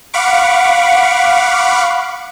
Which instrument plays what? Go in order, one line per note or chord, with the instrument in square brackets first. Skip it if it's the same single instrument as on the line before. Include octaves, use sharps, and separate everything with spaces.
[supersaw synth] F5 F#5 B5 C#6 D6